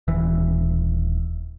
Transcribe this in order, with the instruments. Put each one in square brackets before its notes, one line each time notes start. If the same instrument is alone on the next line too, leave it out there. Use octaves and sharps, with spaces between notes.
[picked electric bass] D#1 E3